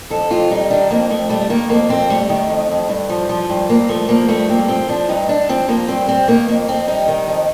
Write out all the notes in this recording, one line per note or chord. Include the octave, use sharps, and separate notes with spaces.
F2 A4
F2 F4
G3 D#4
D#3 D4
F2 A#3
F2 A3
G3 A3
D#3 A#3
F2 A#3
F2 C4
G3 A3
D#3
F2
F2
G2
F3
F3
G2
G2 A#3
F3 A3
F3 A#3
G2 A3
G2 A#3
F3 C4
F3 D4
G2 D#4
G2 D4
F3 C4
F3 A#3
G2 C4
G3 C4
D#3 A#3
F2 A#3
F2 C4
G3 D#4
D#3
F2